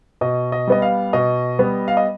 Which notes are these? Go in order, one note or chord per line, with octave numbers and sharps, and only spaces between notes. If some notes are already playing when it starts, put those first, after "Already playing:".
B2 D#5
D#5
G3 B3 D#5
F5
B2 D#5
G3 B3
F5
D#5